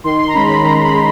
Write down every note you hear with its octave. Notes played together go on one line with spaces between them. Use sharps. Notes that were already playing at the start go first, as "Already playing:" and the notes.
D#3 C6
C6
A#5
G#3 C#4 B5
B5
D#3 A#5
B5
G#3